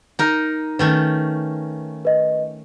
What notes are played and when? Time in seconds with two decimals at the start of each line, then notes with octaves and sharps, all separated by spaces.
0.19 D#4 A#4
0.79 D#3 A3 C#4 B4
2.05 B4 D#5